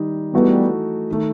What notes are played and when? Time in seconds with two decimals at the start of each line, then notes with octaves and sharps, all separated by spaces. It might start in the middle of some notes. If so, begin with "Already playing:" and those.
Already playing: D#3 G3 D#4
0.33 E3 G3 A3 B3 D#4 F#4 A4
1.11 D#3 A3